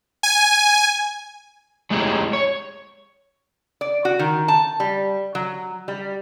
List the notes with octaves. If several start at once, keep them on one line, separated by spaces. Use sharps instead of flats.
G#5
F#3 G#3 A3 D#4 E4 G4
C#5
D5
F#4
D#3
A5
G3
F#3
G3